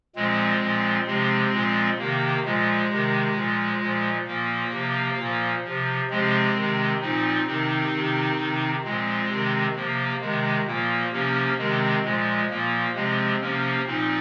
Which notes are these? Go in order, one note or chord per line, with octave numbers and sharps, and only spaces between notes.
A#2 F3 G#3 C4
A#2 F3
C3 F3 G#3 C4
A#2 F3
C3 D#3 A#3
A#2 F3 G#3
C3 D#3
A#2 F3
A#2 F3
A#2 F3 A#3
C3 F3
A#2 F3
C3 F3
C3 F3 G#3 C4
C3 D#3
A#2 F3 C4 D#4
C3 D#3 C4 D#4
C3 D#3
C3 D#3
A#2 F3 G#3 C4
C3 D#3
C3 F3 A#3
C3 D#3 G#3
A#2 F3 A#3
C3 F3 A#3 C#4
C3 D#3 G#3 C4
A#2 F3 G#3
A#2 F3 A#3
C3 F3 G#3 C4
C3 F3 A#3 C#4
A#2 F3 C4 D#4